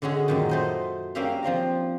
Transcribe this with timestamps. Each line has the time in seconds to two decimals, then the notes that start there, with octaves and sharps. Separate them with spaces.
0.02 D3 G#3 C#4 F#4 G#4
0.28 F#2 A#2 D#3
0.49 A3 C5 D#5
1.15 A#3 C#4 D4 G4 E5 F5
1.43 F3 C4 D4 A#5